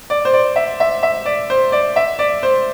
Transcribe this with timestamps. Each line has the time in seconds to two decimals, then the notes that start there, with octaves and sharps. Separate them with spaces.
0.10 D5
0.25 C5
0.34 D5
0.56 E5
0.80 E5
1.03 E5
1.26 D5
1.50 C5
1.72 D5
1.96 E5
2.19 D5
2.43 C5